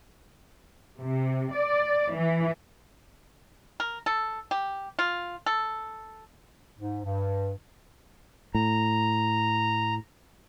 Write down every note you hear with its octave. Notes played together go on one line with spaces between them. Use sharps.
C3
D5
E3
A#4
A4
G4
F4
A4
G#2
G2
A2 A#5